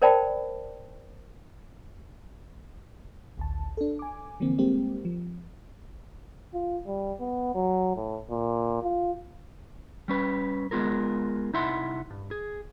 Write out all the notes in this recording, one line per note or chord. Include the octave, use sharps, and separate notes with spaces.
A#4 C5 D5 G5 A5 B5
A1 D2 A5
D4 A4
G#5 D6
D3 E3 F3 A#3 C4
G3 G#3 A#3 C4 G4
F3
F4
G3
B3
F#3
A2
A#2
F4
G3 C#4 B4
G#3 B3 F4 G#4 A#4
C2 D#4 E4 E5 F#5 C6
G2
G#4